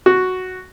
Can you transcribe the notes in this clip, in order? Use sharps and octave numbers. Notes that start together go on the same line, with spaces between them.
F#4